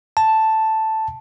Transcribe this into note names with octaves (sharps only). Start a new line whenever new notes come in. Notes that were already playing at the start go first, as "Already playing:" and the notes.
A5